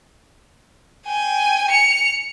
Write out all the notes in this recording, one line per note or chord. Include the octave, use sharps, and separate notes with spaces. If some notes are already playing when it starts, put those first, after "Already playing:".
G5 G#5
C#7 F7